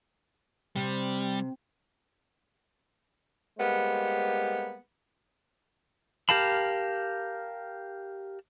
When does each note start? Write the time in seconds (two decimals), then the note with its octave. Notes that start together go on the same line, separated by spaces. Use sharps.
0.76 C3 G3
3.59 G3 G#3 A#3 B3 C5
6.29 G4 A#4 F5 A5 B5